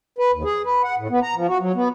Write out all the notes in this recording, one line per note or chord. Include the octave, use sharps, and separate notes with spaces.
B4
D#2
G#4
B4
F#5
A2
B3
A#5
F3
F#4
F#3
B3